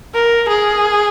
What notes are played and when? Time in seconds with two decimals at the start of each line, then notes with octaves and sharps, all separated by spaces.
0.15 A#4
0.49 G#4